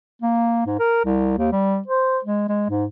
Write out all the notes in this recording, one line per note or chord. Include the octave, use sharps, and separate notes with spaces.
A#3
G#2
A#4
C2
D#2
G3
C5
G#3
G#3
G#2